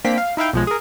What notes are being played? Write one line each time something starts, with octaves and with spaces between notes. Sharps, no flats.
A#3 C4 D4 G5 B6
F5
D#4 E4 E5 F5 G5
B1 F3 G#3
G#4 A#4